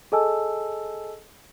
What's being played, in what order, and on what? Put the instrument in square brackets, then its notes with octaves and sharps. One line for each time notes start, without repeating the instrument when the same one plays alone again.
[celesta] G#4 A4 D#5 G#5 A5 E6